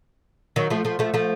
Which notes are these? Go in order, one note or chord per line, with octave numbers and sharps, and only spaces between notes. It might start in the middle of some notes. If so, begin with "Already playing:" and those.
D#3 F#3
F3 A3
F3 A3
F3 A3
F3 A3